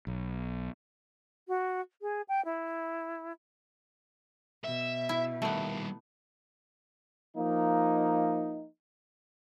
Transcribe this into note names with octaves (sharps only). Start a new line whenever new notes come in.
B1
F#4
G#4
G5
E4
B2 E5
E4
D#3 G3 A3 B3
F3 A#3 D#4